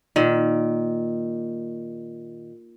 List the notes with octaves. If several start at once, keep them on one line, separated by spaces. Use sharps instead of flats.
A#2 D#3